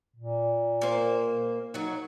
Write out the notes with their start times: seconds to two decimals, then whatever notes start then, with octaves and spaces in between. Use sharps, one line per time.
0.16 A#2
0.81 A#3 C5
1.74 F#3 D#4 F#4